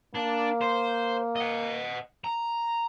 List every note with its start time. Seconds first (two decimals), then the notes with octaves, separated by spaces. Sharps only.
0.15 A#3 D4
0.61 C5
1.36 D#5 F#5
2.24 A#5